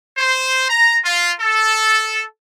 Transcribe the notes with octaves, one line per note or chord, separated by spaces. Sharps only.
C5
A#5
F4
A4